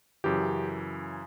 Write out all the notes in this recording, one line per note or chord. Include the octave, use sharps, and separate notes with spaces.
F#2 C#3 E3 G4